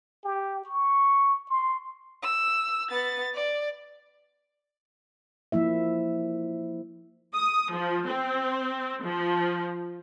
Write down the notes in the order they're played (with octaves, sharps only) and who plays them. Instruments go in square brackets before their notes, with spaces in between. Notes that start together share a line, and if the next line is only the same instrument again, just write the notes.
[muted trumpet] G4
C#6
C6
[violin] E6
B3 A6
D5
[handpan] F3 A#3 E4 E5
[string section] D#6
F3
C4
F3